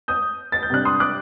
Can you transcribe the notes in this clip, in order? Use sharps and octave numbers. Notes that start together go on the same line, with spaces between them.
D#6 G6
A6
G6
C3 G3 D4 F#6
C6 D#6
D6 F#6